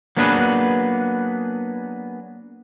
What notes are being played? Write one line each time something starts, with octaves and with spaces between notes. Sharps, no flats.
F#3 A#3 B3 D4 G#4 B4